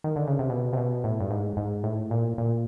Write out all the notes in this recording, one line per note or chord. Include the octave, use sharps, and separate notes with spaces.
D#3
D3
C#3
C3
B2
C3
B2
A2
G2
G#2
G#2
A2
A#2
A#2